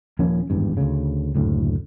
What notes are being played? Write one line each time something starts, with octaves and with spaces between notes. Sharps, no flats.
D#1 F3 A#3 C#4
G#1 E2 G2
D2 C#3
F#1 D2 A2